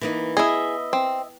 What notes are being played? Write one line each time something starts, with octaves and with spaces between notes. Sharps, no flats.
E3 A#3 D#4
B3 E4 G#4 D#5 E5
C4